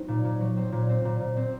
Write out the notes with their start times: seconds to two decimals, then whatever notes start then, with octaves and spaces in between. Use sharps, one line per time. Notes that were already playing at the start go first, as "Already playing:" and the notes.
Already playing: F#3 C4 D#4
0.08 A#2
0.25 A#2
0.40 F#3
0.57 C4
0.72 A#2
0.89 C4
1.05 A#2
1.20 A#2
1.37 C4